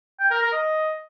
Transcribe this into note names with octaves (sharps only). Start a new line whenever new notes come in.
G5
A#4
A#4
D#5